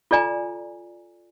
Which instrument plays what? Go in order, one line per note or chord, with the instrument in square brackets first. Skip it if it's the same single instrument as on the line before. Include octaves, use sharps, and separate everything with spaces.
[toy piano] F4 A4 D5 G#5 A#5